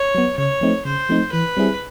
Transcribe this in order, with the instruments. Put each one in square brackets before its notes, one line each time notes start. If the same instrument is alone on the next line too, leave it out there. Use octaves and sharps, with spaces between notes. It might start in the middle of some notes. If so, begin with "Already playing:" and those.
Already playing: [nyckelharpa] C#5
[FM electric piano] F#3 B3
[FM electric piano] C#3 [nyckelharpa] C#5
[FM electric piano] F3 A3 C4 D#4
[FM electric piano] C#3 [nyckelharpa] C5
[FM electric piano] F3 A3 C4 D#4
[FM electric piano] E3 [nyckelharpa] B4
[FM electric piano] G3 C4 E4 G#4